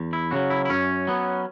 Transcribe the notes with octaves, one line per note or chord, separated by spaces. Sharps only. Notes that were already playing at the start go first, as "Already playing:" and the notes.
Already playing: E2
E4
C#3 F#3 F#4
E4
E4
F#2 C#4
F#3 B3